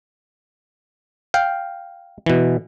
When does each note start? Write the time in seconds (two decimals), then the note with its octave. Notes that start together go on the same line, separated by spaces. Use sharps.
1.34 F5 G5
2.26 B2 E3